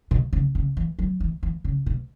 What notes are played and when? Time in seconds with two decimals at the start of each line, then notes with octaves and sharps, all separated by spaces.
0.11 B2
0.33 C#3
0.55 C#3
0.77 E3
0.99 F#3
1.20 E3
1.43 E3
1.64 C#3
1.86 B2